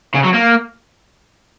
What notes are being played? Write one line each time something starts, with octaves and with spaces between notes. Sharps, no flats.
C#3
F#3
A#3